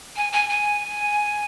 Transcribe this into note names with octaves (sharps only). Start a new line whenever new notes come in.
G#5
G#5
G#5